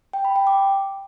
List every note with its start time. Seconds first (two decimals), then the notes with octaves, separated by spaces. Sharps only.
0.13 G5
0.25 B5
0.36 G5
0.47 D6